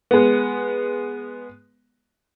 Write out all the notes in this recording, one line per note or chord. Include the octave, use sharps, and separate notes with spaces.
G#3 B3